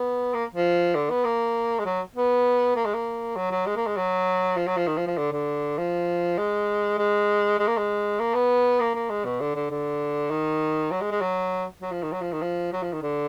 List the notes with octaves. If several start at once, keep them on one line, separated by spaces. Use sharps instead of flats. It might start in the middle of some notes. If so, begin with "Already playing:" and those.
Already playing: B3
A#3
F3
D3
B3
A#3
G#3
F#3
B3
A#3
G#3
A#3
F#3
F#3
G#3
A#3
G#3
F#3
F3
F#3
F3
D#3
F3
F3
D3
D3
F3
G#3
G#3
G#3
A#3
G#3
A#3
B3
A#3
A#3
G#3
B2
D3
D3
D3
D#3
F#3
G#3
G#3
F#3
F#3
F3
D#3
F#3
F3
D#3
F3
F#3
F3
D#3
D3